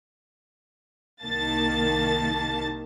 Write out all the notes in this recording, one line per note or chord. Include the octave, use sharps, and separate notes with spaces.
C2 D#3 A#3 A5 A6